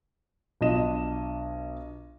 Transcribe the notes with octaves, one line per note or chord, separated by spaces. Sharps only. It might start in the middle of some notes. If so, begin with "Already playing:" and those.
B1 D4 F4 D#5 E7